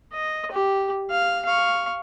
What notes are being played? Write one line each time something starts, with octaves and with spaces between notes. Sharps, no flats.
D#5
G4
F5
F5 C#6